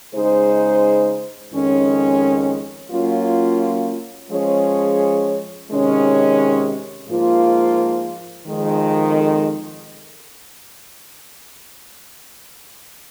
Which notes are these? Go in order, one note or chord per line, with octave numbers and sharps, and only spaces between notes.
C#3 G#3 D#4 G#4 C5
F2 D#3 G#3 C#4
F#3 A#3 C#4 F4
F3 G#3 C#4 G#4 C#5
C3 D#3 G#3 C#4
G#2 F3 A#3 F4
F2 D#3 G#3